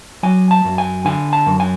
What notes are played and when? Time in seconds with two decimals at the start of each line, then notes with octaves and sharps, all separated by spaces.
0.23 F#3 G#5
0.51 A5
0.65 F#2
0.78 G#5
1.05 D3 G#5
1.33 A5
1.47 F#2
1.60 G#5